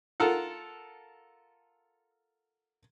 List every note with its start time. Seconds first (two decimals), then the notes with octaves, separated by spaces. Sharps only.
0.20 F4 A4 A#4 F#5